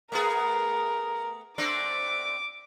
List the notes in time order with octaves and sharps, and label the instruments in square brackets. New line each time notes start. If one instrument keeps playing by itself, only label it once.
[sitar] A3 B3 G#4 [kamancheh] A#4
[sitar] A3 C4 D4 [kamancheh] D6